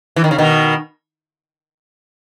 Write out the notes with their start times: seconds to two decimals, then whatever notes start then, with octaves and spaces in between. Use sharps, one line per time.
0.16 E3
0.24 D#3
0.31 C#3
0.38 B2 D#3